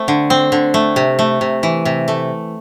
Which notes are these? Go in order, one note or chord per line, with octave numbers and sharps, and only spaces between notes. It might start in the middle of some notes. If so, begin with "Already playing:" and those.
Already playing: A3 C4
D3
C4
D3
A3
C3
A3
C3
E3
C3
A3